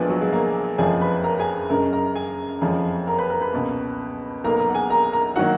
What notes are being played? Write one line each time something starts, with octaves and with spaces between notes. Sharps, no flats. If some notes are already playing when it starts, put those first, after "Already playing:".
Already playing: A#1 A#2 F3 G#3 B3 B4
F#3 F#4
G#3 G#4
A#3 A#4
F#1 F2 F3 G#3 G#4 G#5
B4 B5
A#4 A#5
G#4 G#5
F#2 C#3 G#3 A#4 A#5
A#4 A#5
G#4 G#5
F#1 F2 F3 G#3
A#4 A#5
B4 B5
A#4 A#5
B4 B5
C#2 B2 A#3
B1 B2 A#3 A#4 A#5
A#4 A#5
F#5
G#4 G#5
A#4 A#5
A#4 A#5
D#3 F#3 A#3 F#4 F#5